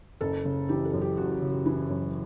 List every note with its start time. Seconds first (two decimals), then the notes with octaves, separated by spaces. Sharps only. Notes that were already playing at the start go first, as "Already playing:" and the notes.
0.21 F#1 A4
0.45 C#3
0.69 E3 G4
0.85 A4
0.93 F#2
1.01 G4
1.17 F#1 F#4
1.42 C#3
1.50 G4
1.66 E3 E4
1.89 F#2